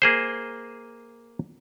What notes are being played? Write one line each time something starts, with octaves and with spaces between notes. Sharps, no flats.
A#3 G#4 C5